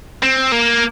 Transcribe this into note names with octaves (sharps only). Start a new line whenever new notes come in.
C4
A#3